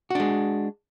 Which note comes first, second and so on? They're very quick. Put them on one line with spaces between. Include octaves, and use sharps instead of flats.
F#4 D4 G#3